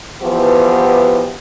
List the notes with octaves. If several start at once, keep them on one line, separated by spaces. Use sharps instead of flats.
E2 E3 F3 F#4 G4